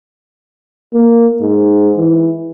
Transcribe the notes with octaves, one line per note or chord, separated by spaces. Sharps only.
A#3
G#2
E3